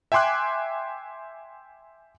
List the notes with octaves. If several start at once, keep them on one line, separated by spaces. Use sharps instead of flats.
E5 G5 G#5 C6 D6 F#6